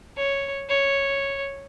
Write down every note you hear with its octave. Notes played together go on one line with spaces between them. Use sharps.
C#5
C#5